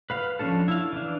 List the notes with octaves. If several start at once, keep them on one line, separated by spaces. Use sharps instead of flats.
B4 F5 F6
F3 C#4 D4 A4
E4 F5
E3 D4